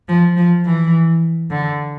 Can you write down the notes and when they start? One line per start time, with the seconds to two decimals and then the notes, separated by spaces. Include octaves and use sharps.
0.08 F3
0.36 F3
0.65 E3
1.50 D3